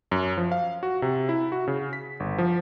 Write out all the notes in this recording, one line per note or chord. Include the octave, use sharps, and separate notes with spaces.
F#2
F3
F5
F#4
C3
E4
F#4
C#3
B6
G1
F3